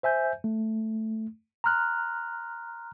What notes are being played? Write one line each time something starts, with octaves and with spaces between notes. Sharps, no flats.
C5 E5 G#5 G6
A3
A#5 C6 F6 F#6